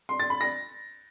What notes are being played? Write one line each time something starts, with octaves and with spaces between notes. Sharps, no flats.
C6
A6
B5
A#6